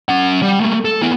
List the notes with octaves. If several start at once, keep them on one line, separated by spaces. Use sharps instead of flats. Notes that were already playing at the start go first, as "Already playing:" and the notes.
C#4 F#5
G3
A3 A#3
A4
B3 E4